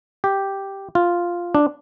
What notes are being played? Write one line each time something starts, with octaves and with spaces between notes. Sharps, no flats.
G4
F4
D4